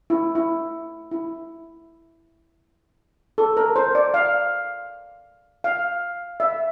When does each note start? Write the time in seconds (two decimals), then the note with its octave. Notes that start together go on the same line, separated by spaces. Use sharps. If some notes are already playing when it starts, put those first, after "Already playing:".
0.10 E4
0.35 E4
1.11 E4
3.38 A4
3.57 A#4
3.76 C5
3.95 D5
4.14 F5
5.64 F5
6.40 E5